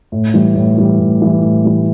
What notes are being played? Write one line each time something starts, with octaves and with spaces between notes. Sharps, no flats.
A2
E3 G3
A2
E3 G3
A2
E3 G3
A2
E3 G3